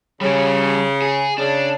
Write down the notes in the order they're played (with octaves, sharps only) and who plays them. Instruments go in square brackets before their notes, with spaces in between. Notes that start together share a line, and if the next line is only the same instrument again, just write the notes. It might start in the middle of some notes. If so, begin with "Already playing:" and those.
[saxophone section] C#3 [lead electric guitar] G3 C#4
[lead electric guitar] G#4
[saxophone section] C#3 [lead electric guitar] D4